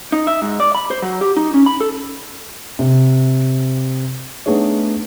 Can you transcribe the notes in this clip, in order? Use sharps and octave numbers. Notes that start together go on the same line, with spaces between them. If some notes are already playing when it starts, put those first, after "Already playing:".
D#4
E5
G#2
D5
B5
C5
F#3
G4
D#4
C#4
B5
A4
C3
A3 B3 D4 D#4 G#4 C#5